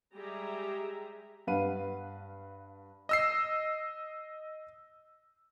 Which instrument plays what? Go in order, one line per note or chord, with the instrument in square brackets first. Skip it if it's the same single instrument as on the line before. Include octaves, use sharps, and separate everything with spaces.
[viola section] G3 G#3 G4 G#4 E5 A#5
[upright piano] G2 B4 F5 F#5 D#7
[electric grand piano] D#5 E6 C7